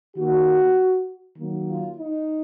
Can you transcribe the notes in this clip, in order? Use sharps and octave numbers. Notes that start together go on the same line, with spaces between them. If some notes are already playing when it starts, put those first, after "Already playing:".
D#3 A#3 F#4
D#3 F#3 A#3
F4
D#4